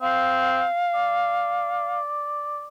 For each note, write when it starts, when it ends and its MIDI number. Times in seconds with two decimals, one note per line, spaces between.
0.02 0.64 60
0.02 1.99 77
0.95 2.67 74